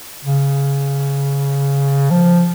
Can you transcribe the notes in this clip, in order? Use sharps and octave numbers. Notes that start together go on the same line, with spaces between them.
C#3
F3